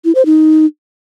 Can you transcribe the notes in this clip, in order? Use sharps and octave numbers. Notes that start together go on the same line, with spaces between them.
E4
C5
D#4